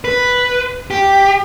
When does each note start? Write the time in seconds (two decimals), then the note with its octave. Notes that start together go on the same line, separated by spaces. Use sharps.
0.04 B4
0.91 G4